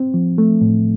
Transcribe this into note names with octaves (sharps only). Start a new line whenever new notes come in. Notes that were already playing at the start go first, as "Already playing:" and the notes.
Already playing: C4
F3
A3
A2